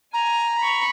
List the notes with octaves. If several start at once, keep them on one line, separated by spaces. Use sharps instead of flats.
G#5 A#5
B5 C#6